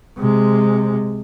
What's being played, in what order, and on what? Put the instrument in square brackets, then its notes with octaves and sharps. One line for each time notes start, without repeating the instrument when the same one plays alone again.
[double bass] C3 G#3